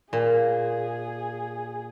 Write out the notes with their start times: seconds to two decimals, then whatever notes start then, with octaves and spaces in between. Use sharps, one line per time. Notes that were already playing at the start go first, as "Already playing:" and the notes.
0.13 A#2 G#4